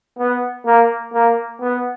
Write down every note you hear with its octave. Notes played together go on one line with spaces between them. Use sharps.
B3
A#3
A#3
B3